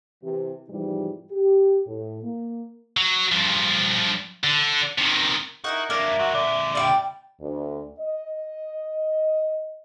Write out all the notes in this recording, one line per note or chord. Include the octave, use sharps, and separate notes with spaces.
C3 E3 G4
G#2 C3 E3 F3 G3 D#4
G4
A2
A#3
F#3
G2 F3
D3
C3 D#3
D#4 E4 F#4 A#4 F#5
F#3 A#3 D4 A#4 E5
G#2 F#3 F#4
A#2 D3 D5
G3 D5 F5 G5
D2
D#5